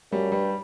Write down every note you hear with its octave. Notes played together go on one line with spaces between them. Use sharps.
F#2 G3
G2 G3